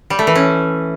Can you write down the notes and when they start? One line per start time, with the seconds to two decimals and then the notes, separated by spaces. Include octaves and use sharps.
0.10 G3
0.19 A3
0.27 E3
0.35 C#4